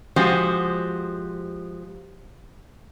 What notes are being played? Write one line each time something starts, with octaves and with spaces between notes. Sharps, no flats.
F3 G#3 F#4 G4 C5